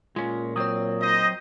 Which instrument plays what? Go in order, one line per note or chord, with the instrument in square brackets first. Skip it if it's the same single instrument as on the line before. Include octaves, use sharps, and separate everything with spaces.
[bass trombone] A#2 [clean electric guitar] G#3 C#4 [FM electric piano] F4
[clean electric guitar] F#3 C4 [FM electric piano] C#5 D#6
[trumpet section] D#4 C5 D#5